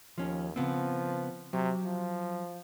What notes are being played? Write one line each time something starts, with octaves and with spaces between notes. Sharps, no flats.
D#2 F3 C#4
C#3 F3 B3 C4
C3 F#3
F3